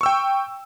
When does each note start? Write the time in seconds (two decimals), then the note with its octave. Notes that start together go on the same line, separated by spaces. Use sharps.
0.01 C#6
0.03 E6
0.06 G5